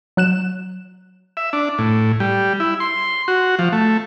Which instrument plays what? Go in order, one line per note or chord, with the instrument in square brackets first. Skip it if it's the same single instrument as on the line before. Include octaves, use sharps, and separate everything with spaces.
[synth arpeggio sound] F#3 F#6 E7
[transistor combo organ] E5
D4
A2
G3
E4
C6
F#4
F3
A3